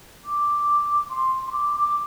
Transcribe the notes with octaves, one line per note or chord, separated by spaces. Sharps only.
D6
C6
C6
D6
D6